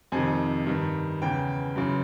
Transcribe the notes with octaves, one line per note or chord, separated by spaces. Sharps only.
F2 C3 D#3 G#5
G2 D#3
E2 C#3 E3 G5
F#2 C#3 E3